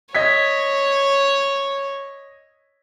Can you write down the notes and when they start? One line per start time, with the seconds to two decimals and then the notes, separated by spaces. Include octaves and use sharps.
0.15 C#5 D#5 G#6 B6